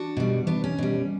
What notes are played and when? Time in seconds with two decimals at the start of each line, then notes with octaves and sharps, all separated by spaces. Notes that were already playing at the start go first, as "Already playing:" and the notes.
Already playing: D4 F#4
0.17 B2 G3
0.47 B3 D4
0.64 C#4
0.78 B2 G3